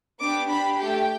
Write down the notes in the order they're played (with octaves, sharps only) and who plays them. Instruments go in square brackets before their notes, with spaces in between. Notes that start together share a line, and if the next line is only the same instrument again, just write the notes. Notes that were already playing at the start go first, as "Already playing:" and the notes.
[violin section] B3 D4 G4 D6
D4 G4 B5
A3 G4 G5